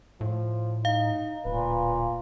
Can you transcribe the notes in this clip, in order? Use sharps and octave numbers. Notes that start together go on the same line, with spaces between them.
A2 F3
D#4 F5
D1 A#2 B4